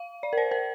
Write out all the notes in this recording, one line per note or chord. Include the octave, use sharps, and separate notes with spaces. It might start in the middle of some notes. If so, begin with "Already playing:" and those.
Already playing: F5
D5
A#4
C5
A#4